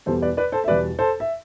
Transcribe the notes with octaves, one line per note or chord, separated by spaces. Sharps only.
E2 B2 G3 A4 C5
B4 D5
B4 D5
A4 C5
E5
E2 B2 G3 B4 D5
A4 C5
E5